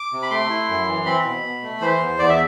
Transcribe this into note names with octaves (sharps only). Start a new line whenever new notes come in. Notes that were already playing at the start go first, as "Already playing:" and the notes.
Already playing: D6
C3
B5
A3 C6
E4
F#2
E3
C4 B5
B2
B2
A3
E3 C5
E2
E2 D5
E5